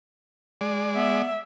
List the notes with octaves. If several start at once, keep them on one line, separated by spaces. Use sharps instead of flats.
G#3 D5
B3 E5